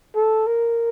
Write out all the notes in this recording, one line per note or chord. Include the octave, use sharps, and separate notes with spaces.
A4
A#4